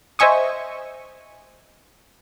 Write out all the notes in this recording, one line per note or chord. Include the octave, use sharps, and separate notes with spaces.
C5 D#5 E5 G#5 C#6 D#6